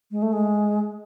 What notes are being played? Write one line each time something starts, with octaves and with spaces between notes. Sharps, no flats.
G#3
A3
G#3